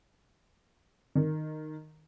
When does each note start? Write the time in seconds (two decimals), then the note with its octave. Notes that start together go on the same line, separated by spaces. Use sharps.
1.15 D#3